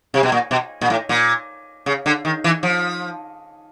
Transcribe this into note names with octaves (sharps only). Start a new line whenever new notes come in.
C3
B2
A#2
B2
A#2
A2
A#2
C#3
D3
D#3
E3
F3